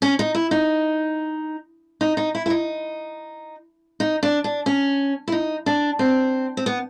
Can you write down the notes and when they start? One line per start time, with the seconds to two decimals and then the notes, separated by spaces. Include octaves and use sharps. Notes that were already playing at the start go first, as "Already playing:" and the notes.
0.02 C#4
0.19 D#4
0.35 E4
0.51 D#4
2.01 D#4
2.17 D#4
2.35 E4
2.46 E4
2.50 D#4
4.00 D#4
4.23 D4
4.44 D4
4.66 C#4
5.28 E4
5.32 D#4
5.66 D4
5.99 C4
6.57 C4
6.66 B3